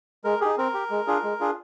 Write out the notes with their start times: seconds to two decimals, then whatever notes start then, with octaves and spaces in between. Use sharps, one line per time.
0.24 G#3 A#4
0.41 D#4 G4 G#4
0.58 C4 A#4
0.74 G4
0.90 G#3
1.07 D4 F4 G#4
1.24 G#3
1.40 D4 F4 G#4